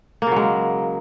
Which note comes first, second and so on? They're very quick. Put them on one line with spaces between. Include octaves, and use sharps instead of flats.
A#3 C#3 F#3 G#3